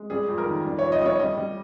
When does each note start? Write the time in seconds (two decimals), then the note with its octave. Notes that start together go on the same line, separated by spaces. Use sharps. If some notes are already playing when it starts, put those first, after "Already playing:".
Already playing: G#3
0.10 G3 G#4
0.28 F2
0.38 A#4
0.46 D#3
0.65 G3
0.79 F2 C#5
0.92 D#5
1.01 G3 C#5
1.19 G3 D#5
1.37 G3